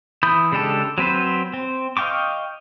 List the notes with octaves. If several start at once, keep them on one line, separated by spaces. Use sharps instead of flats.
E3 B5 D#6 G6
C#3 G#3 D4 G4 A4
F#3 C4 B4 C5
C4
D#5 F5 G5 C#6 D6